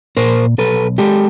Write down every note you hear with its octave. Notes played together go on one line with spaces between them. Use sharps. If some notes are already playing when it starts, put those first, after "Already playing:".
A#2 A#4 C5
B1 A4 B4
G#3 G4 A4